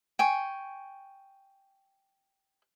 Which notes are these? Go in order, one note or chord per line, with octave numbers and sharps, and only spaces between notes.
G5 G#5 C#6